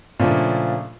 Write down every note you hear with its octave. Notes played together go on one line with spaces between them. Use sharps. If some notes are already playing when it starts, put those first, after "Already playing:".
A#2 C#3 F3 A3 A#3 D4